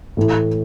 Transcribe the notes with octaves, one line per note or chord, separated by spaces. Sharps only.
A2 E3 A3 E4